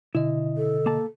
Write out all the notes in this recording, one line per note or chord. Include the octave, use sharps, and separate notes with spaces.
B2 D3 E4 D#5
A4
A#3 A5